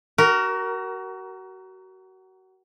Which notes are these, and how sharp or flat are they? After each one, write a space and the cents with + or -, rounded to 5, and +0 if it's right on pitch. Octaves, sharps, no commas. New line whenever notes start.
F#4 +30 A#4 +0